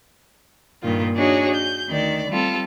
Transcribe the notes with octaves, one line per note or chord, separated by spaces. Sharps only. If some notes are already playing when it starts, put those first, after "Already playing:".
G2 A#2 D#3 F4
D4 D#4 F#4 G#4 C#5
G6
D2 D#3 D5
G3 C4 F4 A4